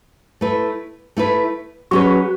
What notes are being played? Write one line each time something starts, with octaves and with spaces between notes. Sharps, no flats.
A3 E4 B4
A3 E4 B4
F#3 C#4 F#4 G#4 B4